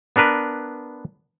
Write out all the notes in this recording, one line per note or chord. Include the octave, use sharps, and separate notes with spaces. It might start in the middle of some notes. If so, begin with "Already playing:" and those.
B3 D4 A#4 B4